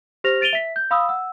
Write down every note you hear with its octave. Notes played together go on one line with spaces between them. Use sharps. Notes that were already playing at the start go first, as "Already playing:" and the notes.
G4 C5 F6 A#6 F7
A6 D7 D#7 F7 G7
E5 B6
G6
F5 B5 D#6 E6
F#5 E6